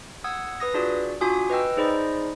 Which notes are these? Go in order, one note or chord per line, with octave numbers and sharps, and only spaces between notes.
F#5 D#6 E6 G#6
B4 D#6 A#6
D4 F4 F#4 G#4 D5
D4 F4 F#4 G#5 D6 D#6
B4 D#5 G5 E6
D#4 G#4 C5 D5 D#5 B5